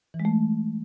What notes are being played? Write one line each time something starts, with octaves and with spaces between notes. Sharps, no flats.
E3
G#3
A3